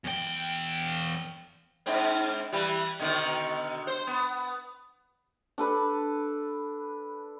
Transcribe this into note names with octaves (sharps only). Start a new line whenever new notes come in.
E2 G5
G#2 C4 D4
E3 G3
B2 D3 D#3
C5
B3
D4 A4 B4